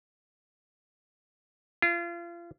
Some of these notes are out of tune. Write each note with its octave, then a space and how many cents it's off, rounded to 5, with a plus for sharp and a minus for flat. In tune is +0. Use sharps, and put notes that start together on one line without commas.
F4 -35